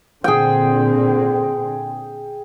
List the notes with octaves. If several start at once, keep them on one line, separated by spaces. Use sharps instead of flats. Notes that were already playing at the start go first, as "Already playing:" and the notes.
A#2 D3 C4 G#4 G5